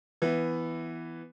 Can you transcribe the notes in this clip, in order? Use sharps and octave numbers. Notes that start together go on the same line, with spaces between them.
E3 B3